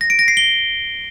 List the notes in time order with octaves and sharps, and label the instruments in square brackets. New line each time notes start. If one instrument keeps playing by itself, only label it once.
[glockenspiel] A#6
D7
A#6
C7
G7